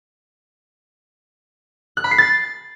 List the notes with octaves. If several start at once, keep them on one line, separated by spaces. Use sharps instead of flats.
F#6
B5
C7
A6